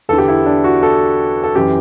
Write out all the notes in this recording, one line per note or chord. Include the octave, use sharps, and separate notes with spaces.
E2 D3 A4
G4
E4
D4
F#4
A4
A4
F#2 E3 G4